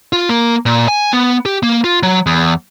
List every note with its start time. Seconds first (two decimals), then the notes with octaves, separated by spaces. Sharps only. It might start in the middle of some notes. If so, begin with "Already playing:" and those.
0.13 F4
0.29 A#3
0.66 A#2
0.88 G#5
1.13 B3
1.46 G4
1.63 A#3
1.84 F4
2.03 F#3
2.26 E2